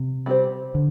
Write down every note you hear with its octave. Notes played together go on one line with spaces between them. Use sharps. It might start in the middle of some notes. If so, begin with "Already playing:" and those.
Already playing: C3
G3 C4 G4 C5
D3